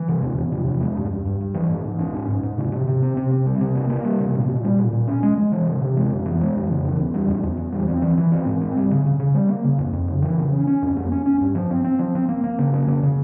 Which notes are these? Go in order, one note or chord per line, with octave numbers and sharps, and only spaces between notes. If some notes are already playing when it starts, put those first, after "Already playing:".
Already playing: E3
C3
E2
E2
C3
E2
G#3
G2
G2
G2
G2
E3
G#2
G#2
C#4
G#2
G#2
G#2
C3
C3
C3
C4
C3
C4
G3
C3
A#3
A#3
G3
C3
A#2
A#2
G3
A#2
A#2
C#4
G#3
G#3
E3
C3
C3
G#3
F2
E3
G#3
F2
C#3
E3
E2
G3
E2
E2
E3
G3
C4
E3
E3
C4
G#2
C4
G3
C#3
C#3
C#3
G3
A#3
C#3
F2
F2
C#3
E3
C#3
C#4
C#4
F2
A#3
C#4
C#4
G2
F3
C4
C4
F3
C4
A#3
A#3
C#3
A#3
C#3
C#3